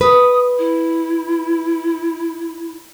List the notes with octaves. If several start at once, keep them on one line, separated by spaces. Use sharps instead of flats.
B4 D#6
E4